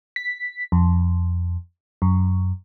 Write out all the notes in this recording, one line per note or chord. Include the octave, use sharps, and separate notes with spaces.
B6
F2
F#2